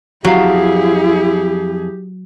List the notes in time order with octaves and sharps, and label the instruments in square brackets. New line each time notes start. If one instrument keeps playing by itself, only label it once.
[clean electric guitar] F2 F5 [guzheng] F#3 [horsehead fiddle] E4 G#4 [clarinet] G4